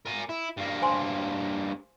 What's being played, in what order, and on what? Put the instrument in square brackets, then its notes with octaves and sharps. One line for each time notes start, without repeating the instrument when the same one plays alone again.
[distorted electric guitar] A#4 G#5
E4
G2 A#3
[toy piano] C5 G#5 C6